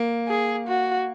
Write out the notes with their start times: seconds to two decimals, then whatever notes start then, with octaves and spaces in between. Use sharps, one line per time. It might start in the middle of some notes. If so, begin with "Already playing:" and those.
Already playing: A#3
0.28 G#4
0.68 F#4